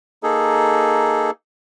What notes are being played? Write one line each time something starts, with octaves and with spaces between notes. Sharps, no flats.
A#3 D#4 G#4 A4